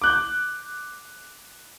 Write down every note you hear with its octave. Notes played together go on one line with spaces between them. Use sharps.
D6 F#6 G6